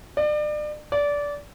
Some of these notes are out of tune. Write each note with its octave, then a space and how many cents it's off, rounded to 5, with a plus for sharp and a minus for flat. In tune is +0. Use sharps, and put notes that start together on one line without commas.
D5 +35
D5 -20